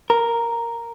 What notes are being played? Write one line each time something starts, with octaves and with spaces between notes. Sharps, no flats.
A#4